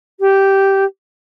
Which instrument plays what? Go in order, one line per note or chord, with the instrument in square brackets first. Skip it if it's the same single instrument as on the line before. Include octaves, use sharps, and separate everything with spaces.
[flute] G4